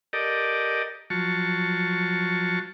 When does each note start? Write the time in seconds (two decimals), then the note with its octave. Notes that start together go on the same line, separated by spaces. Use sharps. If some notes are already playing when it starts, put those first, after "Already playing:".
0.13 G4 A4 A#4 D5 D#5
1.10 F3 F#3 A5 C#6